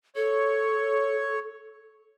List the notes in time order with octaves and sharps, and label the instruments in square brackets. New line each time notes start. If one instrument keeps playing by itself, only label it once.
[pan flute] A4 [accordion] C#5